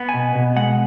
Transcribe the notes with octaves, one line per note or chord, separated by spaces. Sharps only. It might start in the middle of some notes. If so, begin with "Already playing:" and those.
Already playing: B3
G#5
B2
B2
G#3 F#5